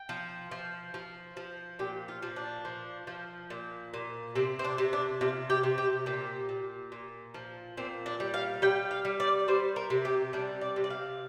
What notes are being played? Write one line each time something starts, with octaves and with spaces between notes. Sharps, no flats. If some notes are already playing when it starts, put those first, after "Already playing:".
Already playing: G5
F3
F3
F3
F3
A#2 G4
F4
F3
D4
F3
F3
A#2
A#2
C3 C4
C4
D4
C3
D4
C3 F4
G4
C3
G4
A#2 G4
A#2
A#2
F3
A#2 C4
D4
G3
F5
G3 G5
F5
G3
D5
G3 C5
A#4
C3
G4
G3 D4
D5
C3
D5
F5